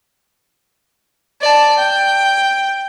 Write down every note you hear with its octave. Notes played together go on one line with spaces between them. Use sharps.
D5 A5
G5